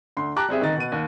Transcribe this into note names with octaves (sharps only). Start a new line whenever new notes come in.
D2 C6
G4 A5 A#5 D6 F#6
G3 C4 G#4 E5
D#1 D#3 D#4 D#5 A6
B2 D#7
D#2